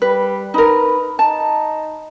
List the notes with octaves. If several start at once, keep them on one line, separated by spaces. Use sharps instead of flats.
G3 B4
D#4 A#4 B4
D#4 A5